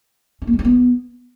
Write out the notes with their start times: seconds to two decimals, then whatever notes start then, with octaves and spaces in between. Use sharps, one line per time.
0.42 C#4
0.47 A#3
0.53 G#3
0.59 C#4
0.65 B3